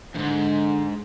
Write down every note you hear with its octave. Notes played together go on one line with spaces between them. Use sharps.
D#2 G#2 D3